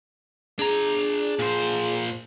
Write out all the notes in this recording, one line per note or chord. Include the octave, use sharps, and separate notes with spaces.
D4 G#4 A#5
A#2 C5